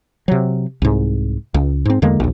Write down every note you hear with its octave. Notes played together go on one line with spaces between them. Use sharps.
C3 F#3
C2 G#2
C#2
G#2 C4
E2 D3 G#3 A#3
A#1 D#2